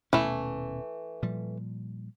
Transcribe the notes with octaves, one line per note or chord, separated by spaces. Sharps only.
D#1 B2 E3 A3 C#4
A#2 F3 G3